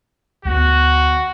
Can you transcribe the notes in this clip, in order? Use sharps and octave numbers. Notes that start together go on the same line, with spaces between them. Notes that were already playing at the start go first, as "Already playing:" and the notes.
D2 B3 F#4